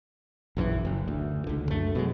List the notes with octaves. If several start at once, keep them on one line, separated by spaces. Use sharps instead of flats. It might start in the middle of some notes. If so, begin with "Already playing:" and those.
A#1 F#2 D3 E3
F#1
D2
C#2 D3
F#2 A3
B2 F#3 G#3